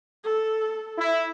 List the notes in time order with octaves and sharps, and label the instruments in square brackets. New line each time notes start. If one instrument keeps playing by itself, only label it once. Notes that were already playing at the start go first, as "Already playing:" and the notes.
[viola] A4
[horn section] E4